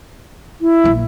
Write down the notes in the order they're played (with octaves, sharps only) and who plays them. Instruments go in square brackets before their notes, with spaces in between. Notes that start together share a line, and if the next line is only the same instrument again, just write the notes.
[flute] E4
[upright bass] A#1 A#3